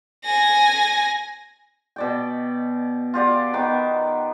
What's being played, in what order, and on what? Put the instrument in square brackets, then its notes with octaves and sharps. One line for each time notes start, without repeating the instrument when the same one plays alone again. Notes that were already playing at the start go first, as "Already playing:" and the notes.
[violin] G#5 A#6
[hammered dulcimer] B2 D5 G5
F4 G4 D5 F#5
D#3 B3 D#4 D6